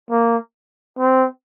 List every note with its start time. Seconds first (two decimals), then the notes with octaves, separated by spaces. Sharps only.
0.10 A#3
0.99 C4